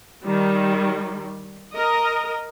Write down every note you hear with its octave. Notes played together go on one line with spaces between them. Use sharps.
D#3 G3
A#4 D#5